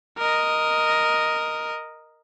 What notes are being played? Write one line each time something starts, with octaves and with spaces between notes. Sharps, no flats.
A#4 D#5